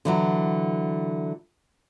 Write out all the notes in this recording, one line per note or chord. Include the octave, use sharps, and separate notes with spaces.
D3 E3 F#3